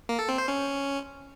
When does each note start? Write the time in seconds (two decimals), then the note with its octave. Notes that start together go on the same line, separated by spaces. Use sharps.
0.09 A#3
0.19 A4
0.29 C4
0.38 C5
0.48 C#4